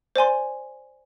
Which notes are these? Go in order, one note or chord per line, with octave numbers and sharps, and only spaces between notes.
C5 D5 G#5 C6